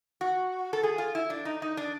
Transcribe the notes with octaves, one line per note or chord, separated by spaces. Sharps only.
F#4
A4
G#4
F4
E4
D4
D#4
D#4
D4